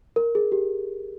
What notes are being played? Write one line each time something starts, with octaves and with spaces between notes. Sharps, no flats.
A#4
G#4
G4